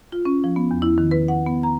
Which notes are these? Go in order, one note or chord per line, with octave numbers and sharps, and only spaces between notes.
F4
C#4
F3
B3
E2
E4
D#3
B4
F#5
B3
A#5